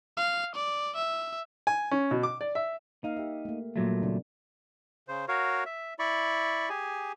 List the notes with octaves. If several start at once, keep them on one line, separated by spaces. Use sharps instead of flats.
F5
D5
E5
G#5
C#4
B2
D6
D5
E5
A#3 D#4 F5
G4 E5
A3 A#3
A#2 F#3 G3 A3 A#3
C#3 C4 D4
C#3 C5
F#4 A#4 C#5 F5
E5
E4 D5 B5 C#6
G4 G#4 G#5